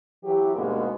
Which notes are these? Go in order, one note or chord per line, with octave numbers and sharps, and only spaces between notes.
E3 F#3 E4 G4
D2 G#2 B2 G#3 A#3 B3